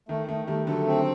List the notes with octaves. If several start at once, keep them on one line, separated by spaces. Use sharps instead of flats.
D#3 A3
D#3 A3
D#3 G3 A3
D3 F#3 A3
C4